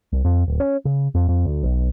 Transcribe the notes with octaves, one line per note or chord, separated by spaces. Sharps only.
C2
F2
D1
C#4
C#3
F2
F2
D2
B1